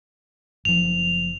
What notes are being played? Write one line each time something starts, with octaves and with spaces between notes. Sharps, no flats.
F#1 F3 F7